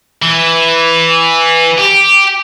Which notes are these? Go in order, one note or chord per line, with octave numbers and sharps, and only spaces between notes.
E3
G4